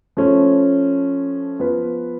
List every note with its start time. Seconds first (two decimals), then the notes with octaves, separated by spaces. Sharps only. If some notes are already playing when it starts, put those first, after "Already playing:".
0.17 F3 A3 C#4
1.59 F3 B3 F4 B4